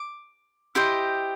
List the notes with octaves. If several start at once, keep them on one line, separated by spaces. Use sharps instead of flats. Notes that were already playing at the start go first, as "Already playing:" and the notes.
Already playing: D6
E4 G4 C5 D#5